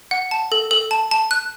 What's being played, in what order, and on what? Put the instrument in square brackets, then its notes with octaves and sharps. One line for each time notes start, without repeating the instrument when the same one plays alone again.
[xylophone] F#5
A5
A4
A4
A5
A5
F#6